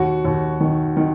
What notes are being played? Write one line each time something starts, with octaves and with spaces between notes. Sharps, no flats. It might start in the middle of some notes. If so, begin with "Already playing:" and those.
Already playing: D#2 F#4
D#2
D#3
D#3